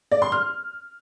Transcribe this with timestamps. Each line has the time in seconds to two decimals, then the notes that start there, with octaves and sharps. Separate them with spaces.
0.11 D5
0.22 C6
0.32 F6